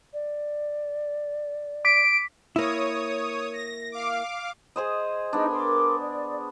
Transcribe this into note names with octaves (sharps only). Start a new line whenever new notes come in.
D5
D6 B6 D7
A#3 E4 C#5 D#6
A#6
F5 D6
G#4 C5 D#5
B3 D4 D#4 G#4
A#4 C6 D6
D5